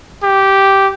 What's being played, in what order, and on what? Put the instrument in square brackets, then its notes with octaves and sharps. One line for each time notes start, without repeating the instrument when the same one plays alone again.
[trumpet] G4